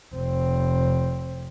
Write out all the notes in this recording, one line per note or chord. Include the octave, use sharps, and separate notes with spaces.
F1 C4